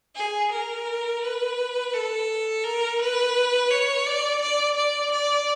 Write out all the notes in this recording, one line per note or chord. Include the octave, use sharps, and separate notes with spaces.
G#4
A#4
B4
A4
A#4
B4
C#5
D5
D5
D5
D5